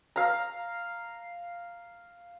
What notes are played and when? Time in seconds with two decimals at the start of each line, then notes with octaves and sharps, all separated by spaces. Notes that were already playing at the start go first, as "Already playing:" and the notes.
0.16 F5 A#5